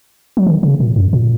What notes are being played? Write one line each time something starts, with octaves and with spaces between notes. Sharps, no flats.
F#3
D#3
C#3
A#2
F#2
A#2